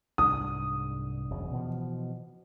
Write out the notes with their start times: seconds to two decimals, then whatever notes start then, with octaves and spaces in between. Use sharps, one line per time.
0.18 C2 G#2 D4 D#6
1.30 E1 F#2 C#3
1.53 B2 E3 F3